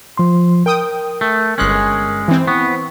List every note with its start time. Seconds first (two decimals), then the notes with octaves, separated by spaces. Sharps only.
0.17 F3 C6
0.66 A#4 G5 D#6
1.21 A3
1.58 G1 G#3 C#4 F#6
2.28 E3 C4
2.48 B3 C#6